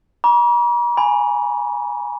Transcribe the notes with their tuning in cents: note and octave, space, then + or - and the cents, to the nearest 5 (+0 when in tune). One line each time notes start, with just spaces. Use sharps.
A#5 +45 D6 -40
G#5 +0 B5 +15